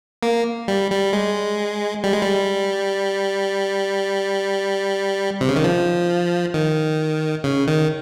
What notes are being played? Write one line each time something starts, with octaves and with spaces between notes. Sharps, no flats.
A#3
G3
G3
G#3
G3
G#3
G3
C3
C#3
D#3
F3
D#3
C#3
D#3